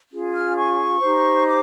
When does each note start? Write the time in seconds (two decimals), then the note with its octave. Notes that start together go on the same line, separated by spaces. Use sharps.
0.11 C#4 F4 G#4
0.33 F6
0.56 C#6
1.01 D#4 G4 C5
1.46 D6